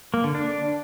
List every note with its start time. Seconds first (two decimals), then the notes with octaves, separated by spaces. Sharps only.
0.14 A#3
0.24 D3
0.35 D4